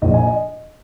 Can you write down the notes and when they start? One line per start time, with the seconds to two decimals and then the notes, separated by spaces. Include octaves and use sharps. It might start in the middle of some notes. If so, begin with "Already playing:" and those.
0.02 A#1 A#2 F3 D#5
0.14 D#5 G#5
0.27 D#5